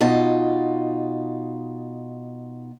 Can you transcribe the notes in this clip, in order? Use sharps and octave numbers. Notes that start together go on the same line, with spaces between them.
B2 D#4 F4 A5